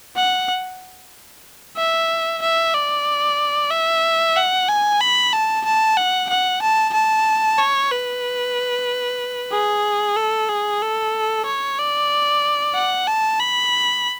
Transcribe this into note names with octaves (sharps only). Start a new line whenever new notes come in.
F#5
E5
E5
D5
E5
F#5
G#5
B5
A5
A5
F#5
F#5
A5
A5
C#5
B4
G#4
A4
G#4
A4
C#5
D5
F#5
A5
B5